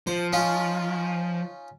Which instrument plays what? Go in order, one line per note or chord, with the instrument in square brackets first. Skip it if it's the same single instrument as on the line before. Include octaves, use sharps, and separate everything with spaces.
[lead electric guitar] F3 [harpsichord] C5
[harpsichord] C#4 D#4 F4